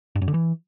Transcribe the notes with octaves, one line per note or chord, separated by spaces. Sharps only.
G2
F#2
D3
E3